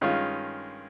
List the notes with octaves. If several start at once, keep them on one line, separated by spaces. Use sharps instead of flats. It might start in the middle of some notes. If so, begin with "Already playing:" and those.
G2 D#3 G#3 C#4 F4